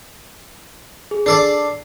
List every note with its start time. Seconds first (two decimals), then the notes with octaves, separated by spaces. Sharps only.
1.11 G#4
1.26 D4 A4 D5 C7